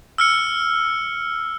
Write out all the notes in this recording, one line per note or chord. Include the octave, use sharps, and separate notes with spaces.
E6 F6 C#7